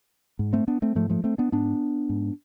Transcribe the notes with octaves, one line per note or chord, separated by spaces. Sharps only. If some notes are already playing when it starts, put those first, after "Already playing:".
G#2
A3 C4
B3 D4
A3 C4
G#2 F3 A3
F3 A3
A3 C4
B3 D4
G#2 B3 D4
G#2